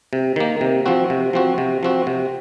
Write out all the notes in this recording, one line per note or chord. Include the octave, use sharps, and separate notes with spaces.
C3
D#3 A#3
C3
F3 C4 F#4
C3
F3 C4 F#4
C3
F3 C4 F#4
C3